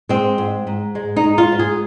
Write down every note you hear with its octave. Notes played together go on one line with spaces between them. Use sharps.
G#3 C4
G#2
G#2
G#3
D#4
G#3
F4
G#2
G#4